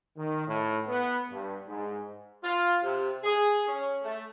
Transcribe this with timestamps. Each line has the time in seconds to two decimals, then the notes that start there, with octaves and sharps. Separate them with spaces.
0.16 D#3
0.47 A2
0.87 B3
1.31 G2
1.67 G#2
2.42 F4
2.82 C3
3.23 G#4
3.67 C#4
4.02 A3